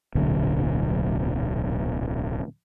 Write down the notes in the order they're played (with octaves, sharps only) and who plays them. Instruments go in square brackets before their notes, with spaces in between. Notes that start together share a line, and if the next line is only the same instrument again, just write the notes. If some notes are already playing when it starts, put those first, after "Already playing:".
[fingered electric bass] D1 B1 A#2 D3